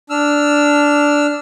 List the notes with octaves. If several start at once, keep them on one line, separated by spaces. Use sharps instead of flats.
D4 E6 F6